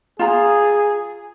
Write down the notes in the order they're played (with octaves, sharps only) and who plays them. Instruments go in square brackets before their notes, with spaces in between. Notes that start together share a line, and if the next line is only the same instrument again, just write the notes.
[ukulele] F4 A#5 [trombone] G#4